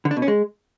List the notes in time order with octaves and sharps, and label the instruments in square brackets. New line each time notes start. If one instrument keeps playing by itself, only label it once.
[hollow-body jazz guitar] D3
D4
B2
C#4
G#3